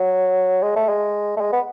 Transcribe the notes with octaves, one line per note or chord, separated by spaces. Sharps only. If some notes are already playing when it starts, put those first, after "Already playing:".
Already playing: F#3
G#3
A3
G#3
A3
G#3
B3